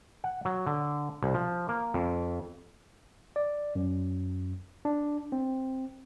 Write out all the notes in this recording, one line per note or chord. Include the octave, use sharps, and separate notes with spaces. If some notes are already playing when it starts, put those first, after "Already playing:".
F#5
F#3
D3
C2
F3
A#3
F2
D5
F#2
D4
C4